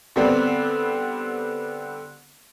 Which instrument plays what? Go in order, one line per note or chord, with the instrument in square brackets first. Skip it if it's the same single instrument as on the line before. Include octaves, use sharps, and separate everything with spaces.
[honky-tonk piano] D3 G3 B3 C4